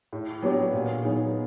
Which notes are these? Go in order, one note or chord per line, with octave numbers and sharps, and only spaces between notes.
A2
F#3 B3 D4 G4
A#2
F#3 B3 D#4 G#4